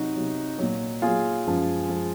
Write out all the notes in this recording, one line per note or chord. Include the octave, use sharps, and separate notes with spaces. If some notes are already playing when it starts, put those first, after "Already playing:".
Already playing: C3 F#3 D#4 F#4
C3 F#3
A#2 F#3
A#2 F#3 F4 G#4
F#2 F3 G#3
F3 G#3